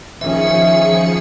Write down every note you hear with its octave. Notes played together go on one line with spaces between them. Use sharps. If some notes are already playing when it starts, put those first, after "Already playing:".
D#3 F3 C#4 G#4 E5 C#7